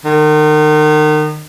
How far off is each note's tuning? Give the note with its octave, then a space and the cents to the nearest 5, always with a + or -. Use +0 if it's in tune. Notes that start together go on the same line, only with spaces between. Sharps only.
D#3 -35